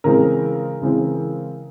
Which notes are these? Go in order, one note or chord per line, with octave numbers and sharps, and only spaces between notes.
C#3 E3 G#3 C4 A#4
C#3 E3 G#3 C4